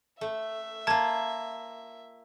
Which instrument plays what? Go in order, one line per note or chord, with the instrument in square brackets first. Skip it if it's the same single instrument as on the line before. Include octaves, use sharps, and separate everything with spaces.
[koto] A3 [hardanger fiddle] E5
[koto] A#3 F4 [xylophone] A5 G#6